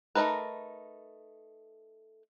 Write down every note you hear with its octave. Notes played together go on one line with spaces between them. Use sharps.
A3 D4 D#4 A#4 B4